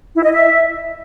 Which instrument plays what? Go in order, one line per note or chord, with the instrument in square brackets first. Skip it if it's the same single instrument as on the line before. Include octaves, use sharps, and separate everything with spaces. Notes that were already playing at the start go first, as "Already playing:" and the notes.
[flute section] E4
D#5
E5